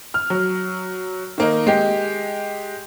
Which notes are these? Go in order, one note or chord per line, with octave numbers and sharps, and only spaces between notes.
F6
F#3
D#3 A#3 D#4
G#3 G4